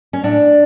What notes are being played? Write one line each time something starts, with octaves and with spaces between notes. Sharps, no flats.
C#4
A2 D4